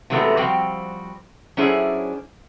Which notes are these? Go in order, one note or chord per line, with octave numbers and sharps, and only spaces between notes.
C3 E3 F#3 G#3 A3 B3
F3 G3 C4 F#4 G5
F#3 C#4 D4 E4 G#4 C5